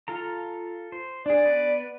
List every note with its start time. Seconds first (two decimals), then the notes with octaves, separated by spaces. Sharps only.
0.08 F4 A4 A#5
0.92 C5
1.26 D4 G#4 D5
1.46 B3 B4